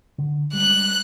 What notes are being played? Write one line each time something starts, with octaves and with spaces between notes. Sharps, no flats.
D3
G3 G#3 F#6